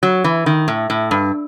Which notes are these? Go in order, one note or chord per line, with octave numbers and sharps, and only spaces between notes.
F#3
E3
D#3
A2
A2
G2